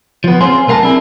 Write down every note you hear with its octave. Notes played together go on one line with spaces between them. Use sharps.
F3 B3
C4 C#4 F4 G#4 C5
B1 A3 A#4 F5 A5 A#5
C4 D4 E4 G#4